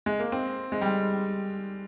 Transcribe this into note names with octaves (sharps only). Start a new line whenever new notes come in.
G#3
A#3
C4
G#3
G3